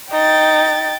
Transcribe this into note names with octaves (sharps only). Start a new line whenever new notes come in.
D#4 G5 A6